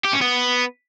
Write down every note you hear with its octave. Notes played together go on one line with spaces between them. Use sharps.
G4
C#4
B3